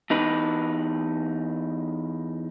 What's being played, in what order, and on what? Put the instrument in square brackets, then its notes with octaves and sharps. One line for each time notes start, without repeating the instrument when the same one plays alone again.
[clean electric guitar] E2 D#4 B4